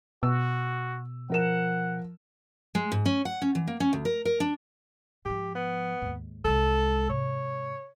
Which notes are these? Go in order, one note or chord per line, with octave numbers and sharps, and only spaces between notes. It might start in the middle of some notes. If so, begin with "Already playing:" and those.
B2 F#4 E6
F3 A#4 F#5 E7
G#3
G#2
C#4
F#5
C#4
E3
A#3
C#4
D2
A#4
A#4
D4
G#2 F3 G4
B3
D#2 G#2
C2 G#3 A4
G#2 C3 C#5